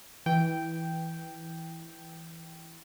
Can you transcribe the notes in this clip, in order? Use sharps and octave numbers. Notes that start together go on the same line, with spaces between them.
E3 G5